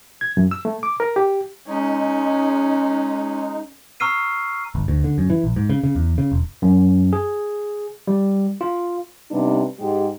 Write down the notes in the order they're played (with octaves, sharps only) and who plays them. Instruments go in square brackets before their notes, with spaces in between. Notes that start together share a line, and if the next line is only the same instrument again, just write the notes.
[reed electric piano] G#6
F#2
E6
A3
D6
A#4
G4
[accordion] G#3 D#4 [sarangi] C#4
[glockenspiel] A#5 C#6 E6 F6 C7 D#7
[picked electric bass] G1
D2
D3
F#2
E3
A#1
G#2
C#3
C#3
E2
C#3
E1
[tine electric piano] F#2
G#4
G3
F4
[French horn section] C3 G3 B3 D4 D#4
G#2 G#3 G4